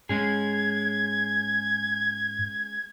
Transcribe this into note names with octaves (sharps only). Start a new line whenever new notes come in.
G#2 G#3 C#4 G#4 G#6